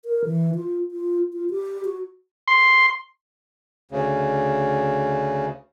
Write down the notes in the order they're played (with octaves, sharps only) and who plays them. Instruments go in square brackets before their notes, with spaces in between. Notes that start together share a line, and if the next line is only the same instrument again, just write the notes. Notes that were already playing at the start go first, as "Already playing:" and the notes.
[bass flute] A#4
E3
F4
F4
F4
G4
F#4
[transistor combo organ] C6
[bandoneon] D2 C#3